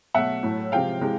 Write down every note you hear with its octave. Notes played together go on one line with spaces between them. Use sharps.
B2 F#3 A3 E5 F#5
A2 F#3 A3
C3 F3 G#3 F5 G5
C3 E3 G#3